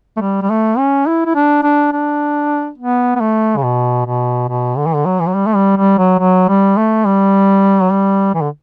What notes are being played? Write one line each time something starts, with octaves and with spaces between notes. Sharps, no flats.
A3
G3
G3
A3
C#4
E4
E4
D4
D4
D4
B3
B3
A3
C#3
B2
B2
B2
D3
E3
D3
F#3
E3
F#3
G3
A3
G3
G3
F#3
F#3
G3
A3
G3
F#3
G3
E3
D3